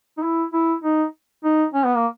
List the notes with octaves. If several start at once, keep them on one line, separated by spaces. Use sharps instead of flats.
D#4
E4
E4
D#4
D#4
C#4
B3
A#3